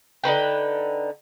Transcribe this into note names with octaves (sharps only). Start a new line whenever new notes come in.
D3 D#4 B4 G5